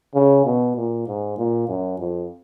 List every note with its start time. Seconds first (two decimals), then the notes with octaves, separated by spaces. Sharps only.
0.14 C#3
0.45 B2
0.77 A#2
1.07 G#2
1.38 A#2
1.68 F#2
1.99 F2